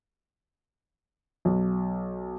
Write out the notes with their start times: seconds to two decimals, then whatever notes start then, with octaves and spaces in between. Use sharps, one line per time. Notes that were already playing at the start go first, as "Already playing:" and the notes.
1.45 B1